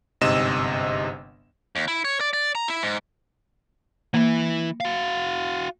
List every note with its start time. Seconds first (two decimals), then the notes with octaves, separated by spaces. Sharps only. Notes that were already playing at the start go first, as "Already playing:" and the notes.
0.21 G1 G#2 C3 D#5 E6 E7
1.76 D#2
1.88 E4
2.05 C#5
2.21 D5
2.33 D5
2.55 A#5
2.68 E4
2.83 G#2
4.14 E3 A#3 E4
4.80 F#4 F5